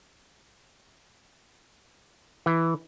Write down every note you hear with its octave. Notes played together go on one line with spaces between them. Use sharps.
E3